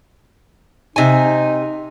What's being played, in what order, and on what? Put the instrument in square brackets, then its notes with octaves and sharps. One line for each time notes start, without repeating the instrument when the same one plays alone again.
[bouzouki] C3 G#5 [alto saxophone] D#4